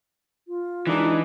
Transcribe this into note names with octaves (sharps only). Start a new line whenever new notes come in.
F4
E3 G#3 D4 D#4